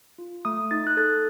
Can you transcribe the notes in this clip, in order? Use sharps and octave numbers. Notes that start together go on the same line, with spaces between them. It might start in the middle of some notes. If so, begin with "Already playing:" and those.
F4
A3 D#6
D#4 A6
F#6
A4 A6